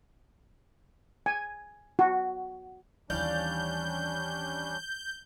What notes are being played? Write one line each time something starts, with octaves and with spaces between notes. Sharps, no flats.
G#5
F#4
D#2 E3 G3 C#4 D4 D5 F5 G6